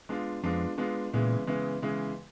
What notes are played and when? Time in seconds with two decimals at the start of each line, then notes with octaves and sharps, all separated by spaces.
0.09 G#3 B3 D4 F4
0.44 F2 G#3 B3 D4 F4
0.78 G#3 B3 D4 F4
1.13 A#2 C#3 E3 G#3 B3
1.47 C#3 E3 G#3 B3
1.82 C#3 E3 G#3 B3